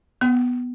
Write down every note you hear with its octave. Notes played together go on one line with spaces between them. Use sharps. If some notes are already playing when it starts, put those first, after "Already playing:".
B3